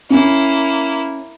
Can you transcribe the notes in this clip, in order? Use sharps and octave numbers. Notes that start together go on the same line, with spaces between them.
A#3 C#4 E4